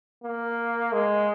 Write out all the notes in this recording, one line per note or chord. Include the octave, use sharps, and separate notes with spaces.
A#3
G#3